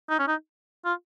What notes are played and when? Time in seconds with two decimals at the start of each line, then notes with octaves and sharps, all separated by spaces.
0.09 D#4
0.19 C#4
0.28 D#4
0.85 F4